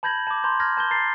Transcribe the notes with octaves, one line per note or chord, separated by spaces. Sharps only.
A5 B5 G6 G#6 A#6 F#7
A5 D6
A#5 C6 G6
F6 G#6 A#6
A5 G6 G7
A#5 A6 C7